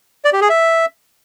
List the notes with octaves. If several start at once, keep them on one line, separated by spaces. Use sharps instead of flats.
D5
G4
G#4
E5